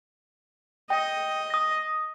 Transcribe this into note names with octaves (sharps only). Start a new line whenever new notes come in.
D#5 G5
D#6 A#6